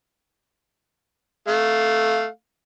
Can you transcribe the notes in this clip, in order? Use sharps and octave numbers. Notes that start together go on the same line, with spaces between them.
A3 F5